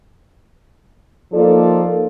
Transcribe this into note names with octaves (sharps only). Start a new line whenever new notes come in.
F3 A#3 D#4 F4 A4 D5